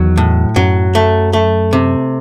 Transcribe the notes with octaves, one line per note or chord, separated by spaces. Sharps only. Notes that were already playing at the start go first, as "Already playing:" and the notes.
Already playing: E2 D#3 F#3
A2
F#2 F#3
A3
A3
C3